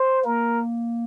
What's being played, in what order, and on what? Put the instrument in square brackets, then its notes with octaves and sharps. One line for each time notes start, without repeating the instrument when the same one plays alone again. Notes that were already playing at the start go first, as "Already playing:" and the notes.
Already playing: [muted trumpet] C5
[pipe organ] A#3 [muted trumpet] A#4